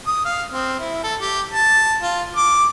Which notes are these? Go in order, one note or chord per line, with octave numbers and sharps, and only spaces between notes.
D#6
F5
C4
E4
A4
G4
A5
F4
D6